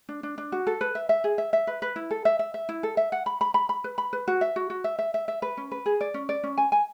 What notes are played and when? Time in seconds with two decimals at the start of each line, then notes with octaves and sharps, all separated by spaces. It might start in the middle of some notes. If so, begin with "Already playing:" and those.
0.09 D4
0.23 D4
0.38 D4
0.52 F#4
0.67 A4
0.81 B4
0.95 E5
1.09 E5
1.24 G#4
1.38 E5
1.53 E5
1.67 B4
1.82 B4
1.96 E4
2.11 A4
2.25 E5
2.39 E5
2.54 E5
2.69 E4
2.83 A4
2.97 E5
3.12 F#5
3.26 B5
3.41 B5
3.54 B5
3.69 B5
3.84 B4
3.98 B5
4.13 B4
4.28 F#4
4.41 E5
4.56 F#4
4.70 F#4
4.84 E5
4.99 E5
5.14 E5
5.28 E5
5.42 B4
5.57 C#4
5.72 B4
5.86 G#4
6.01 D5
6.14 C#4
6.29 D5
6.43 C#4
6.58 G#5
6.72 G#5